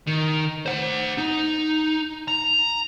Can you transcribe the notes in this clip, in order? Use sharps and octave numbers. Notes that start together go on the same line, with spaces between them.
D#3
C5 F#5
D#4
A#5